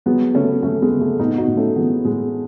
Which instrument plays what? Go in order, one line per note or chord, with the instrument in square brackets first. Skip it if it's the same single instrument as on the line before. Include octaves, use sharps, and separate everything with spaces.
[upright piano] F#3 G#3 B3
C#3 A3 C#4
F#3 A3 C#4
G#3 B3
C#3
A3
A2 B3 D#4
D#4 F#4
A2
A3 C#4
E3 G#3 B3
A2 G#3